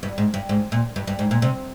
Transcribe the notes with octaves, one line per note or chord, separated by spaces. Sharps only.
G2
G#2
G2
G#2
A#2
G2
G2
G#2
A#2
C3